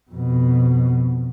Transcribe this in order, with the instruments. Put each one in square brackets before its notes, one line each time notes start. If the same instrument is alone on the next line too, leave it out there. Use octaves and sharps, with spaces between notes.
[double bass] F2 B2